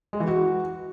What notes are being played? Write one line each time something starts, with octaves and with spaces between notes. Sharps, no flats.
G#3
E3
F#4